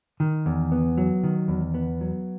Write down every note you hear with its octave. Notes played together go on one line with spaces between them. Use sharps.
D#3
E2
B3
F#3
D#3
E2
B3
F#3